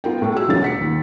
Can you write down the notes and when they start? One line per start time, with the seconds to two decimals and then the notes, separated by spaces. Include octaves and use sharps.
0.04 B3 F4 A#4 G5
0.22 A2 A3
0.34 A3 F#4 G#4 E6
0.48 E1 F#2 D3 C#4 F4 A6
0.62 F#5 B6 C#7
0.81 D#2